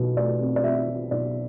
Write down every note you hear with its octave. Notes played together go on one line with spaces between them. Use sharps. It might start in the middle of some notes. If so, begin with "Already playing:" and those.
Already playing: B1 B2
A3 D5
C4
D5
C4 E5
C4
B1 D5